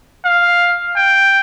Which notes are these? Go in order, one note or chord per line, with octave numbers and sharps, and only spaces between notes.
F5
G5